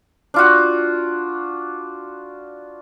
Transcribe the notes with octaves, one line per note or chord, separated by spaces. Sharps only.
D4 F4 F#4